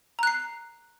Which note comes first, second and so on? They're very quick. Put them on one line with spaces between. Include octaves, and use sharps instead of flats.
A#5 F#6 C7